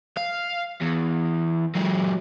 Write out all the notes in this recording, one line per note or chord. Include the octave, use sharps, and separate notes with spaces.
F5
E2
F#3 G#3